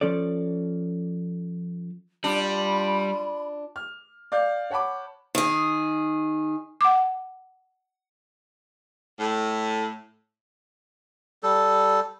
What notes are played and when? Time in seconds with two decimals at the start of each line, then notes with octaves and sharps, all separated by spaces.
0.01 F3 C#4 A4 D5
2.24 G3 D4 F4 B5
3.76 F6
4.32 D5 F5 G6
4.70 C#5 F#5 A5 B5 D6
5.35 D#3 G#4
6.81 F#5 D6
9.18 A2
11.43 G3 A4